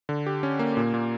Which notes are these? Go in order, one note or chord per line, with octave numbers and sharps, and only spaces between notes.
D3
G4
C#4
A#3
A#2
A#2